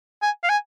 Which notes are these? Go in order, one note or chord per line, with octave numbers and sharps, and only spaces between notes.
G#5
F5
G#5